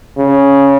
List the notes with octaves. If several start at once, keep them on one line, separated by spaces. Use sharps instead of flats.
C#3